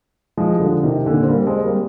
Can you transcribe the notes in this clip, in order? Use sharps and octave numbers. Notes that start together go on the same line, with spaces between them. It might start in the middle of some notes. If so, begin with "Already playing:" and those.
F3 G#3
G3
D3 F3
C3 D#3
A#2 D3
C4
G3 A#3
G#3 C4
G3 A#3